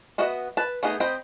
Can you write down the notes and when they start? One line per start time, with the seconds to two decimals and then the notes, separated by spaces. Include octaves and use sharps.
0.18 B3 F#4 B4 D#5 E5
0.57 B4 A5
0.83 A3 B3 D#4 G#4
1.00 C4 C5 D#5 G5 B5